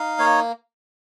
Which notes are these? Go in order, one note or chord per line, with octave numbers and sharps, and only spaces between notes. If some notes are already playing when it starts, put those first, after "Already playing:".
Already playing: D#4 F5
A#3 C#5